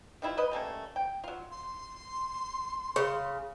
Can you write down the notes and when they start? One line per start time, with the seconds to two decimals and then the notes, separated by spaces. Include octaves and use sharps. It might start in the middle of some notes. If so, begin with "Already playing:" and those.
0.22 D#3 G3 E4 F4
0.37 A#4 B4 D#5
0.52 G3 A3 A#3 C#4
0.96 G5
1.24 F#3 F4
1.51 C6
2.96 C#3 C#5